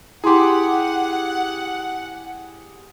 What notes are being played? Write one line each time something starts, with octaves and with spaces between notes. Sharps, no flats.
E4 G4 G#4 F#5 C6 D6